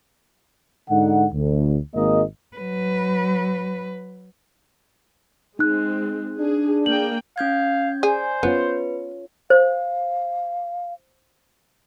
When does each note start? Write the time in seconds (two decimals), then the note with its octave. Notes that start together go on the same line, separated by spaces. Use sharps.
0.90 G#2 D3 D#4 F#5
1.34 D2
1.96 G#1 G#3 A#3 D#5
2.57 F#3 B4
5.59 G#3 C4 D#4 F#6
6.39 D4 G#4
6.86 A#3 G#4 G5 F#7
7.38 C#4 F5 G6 G#6
8.03 G#4 C5 D5 G#5
8.43 B3 C#4 F4 B4 C#5
9.50 C5 F5